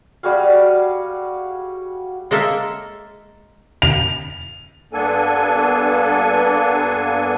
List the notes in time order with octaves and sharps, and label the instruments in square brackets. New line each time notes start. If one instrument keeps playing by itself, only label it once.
[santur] G3 F#4 G#4 F5
[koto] G#3 A#3 A4 E5
[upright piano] F7
[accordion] G2 A#3 B3 D4 A4 G#5